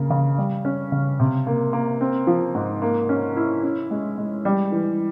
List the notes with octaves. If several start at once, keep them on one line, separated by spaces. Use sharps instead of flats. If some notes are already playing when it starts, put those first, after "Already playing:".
Already playing: C#3 A#3
C#3
G3
C#4
C#3
C3
A#3
A#3
C4
F3
G#2
A#3
C#4
E4
C#4
G#3
G#3
G3
E3